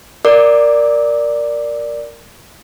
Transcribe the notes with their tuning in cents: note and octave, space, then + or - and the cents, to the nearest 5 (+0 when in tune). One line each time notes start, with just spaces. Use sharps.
A#4 +0 D5 +0 D6 +20